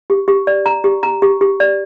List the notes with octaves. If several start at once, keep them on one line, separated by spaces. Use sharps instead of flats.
G4
G4
D5
A#5
G4
A#5
G4
G4
D5